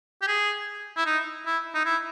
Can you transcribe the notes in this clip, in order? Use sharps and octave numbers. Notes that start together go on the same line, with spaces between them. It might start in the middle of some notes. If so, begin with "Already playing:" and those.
G4
G#4
E4
D#4
E4
D#4
E4